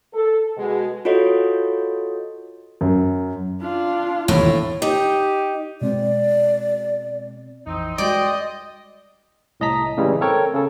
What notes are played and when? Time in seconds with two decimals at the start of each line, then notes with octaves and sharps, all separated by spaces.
0.13 A4
0.57 B2 G#3
1.05 F4 F#4 A4 C#5 D#5
2.81 F#2
3.62 D4 F4
4.28 E1 D#2 A2
4.82 D#4 G4
5.81 B2 G#3 C4 D5
7.66 A#1 F2 E3 C4 D#4
7.98 G3 G#3 F#4 C5 D5 D#5 G5
9.60 C2 A2 D#5 A5 A#5 B6
9.97 A2 C#3 E3 G3 G#3
10.21 C4 A4 A#4 C#5 G5
10.53 C#3 C#4 A4